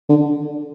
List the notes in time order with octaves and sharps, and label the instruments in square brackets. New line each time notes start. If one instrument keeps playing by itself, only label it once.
[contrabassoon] D3